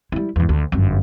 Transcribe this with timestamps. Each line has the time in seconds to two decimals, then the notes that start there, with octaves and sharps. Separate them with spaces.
0.12 G3 E4
0.36 E2 G#2
0.49 D2
0.72 G1 F#2